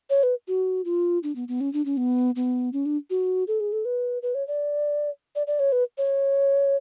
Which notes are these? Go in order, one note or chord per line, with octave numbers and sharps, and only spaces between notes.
C#5
B4
F#4
F4
D4
B3
B3
C#4
D4
C#4
B3
B3
C#4
D4
F#4
A4
G#4
A4
B4
B4
C#5
D5
D5
D5
C#5
B4
C#5